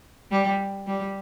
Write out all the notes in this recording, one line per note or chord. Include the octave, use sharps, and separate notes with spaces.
G3
G3